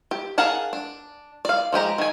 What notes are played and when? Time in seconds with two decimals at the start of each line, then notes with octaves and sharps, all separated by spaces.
0.11 G4
0.38 G#4 A#4 F5 F#5 A5
0.73 D4
1.45 D5 F5
1.72 F3 G#3 G4 A#5
1.98 D#3 G#5